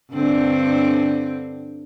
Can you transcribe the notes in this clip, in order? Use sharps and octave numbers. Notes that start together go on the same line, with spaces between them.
G2 D3 C4